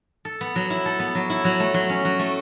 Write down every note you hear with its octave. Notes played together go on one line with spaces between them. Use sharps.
A4
B3
F#3
E4
A4
B3
F#3
E4
F#3
A3
F#3
C#4
F#3
A3